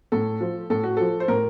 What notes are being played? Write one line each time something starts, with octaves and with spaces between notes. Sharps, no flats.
A2 A4
F3
A2 A4
F#4
F3 A4
C5
A2 A#4